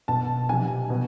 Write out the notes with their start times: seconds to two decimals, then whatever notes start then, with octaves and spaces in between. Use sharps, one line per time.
0.08 B2 A5
0.49 C3 F3 G#5
0.90 B2